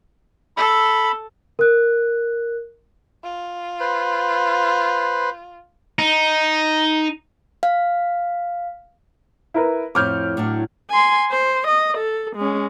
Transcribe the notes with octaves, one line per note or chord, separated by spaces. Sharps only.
A4 B5
A#4 F#6
F4
B4 C5
D#4
F5
E4 A#4 B4
F2 A2 C#5 D6 F6 G6
A2 F#3 D4
G#5 C6
C5
D#5
A4
G#3 C#4